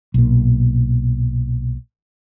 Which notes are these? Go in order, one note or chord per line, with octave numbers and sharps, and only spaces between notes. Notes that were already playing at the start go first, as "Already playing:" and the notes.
B1 A#2